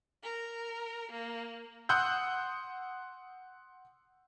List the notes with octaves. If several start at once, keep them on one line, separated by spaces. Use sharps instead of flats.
A#4
A#3
F#5 C6 D#6 E6 F#6 G6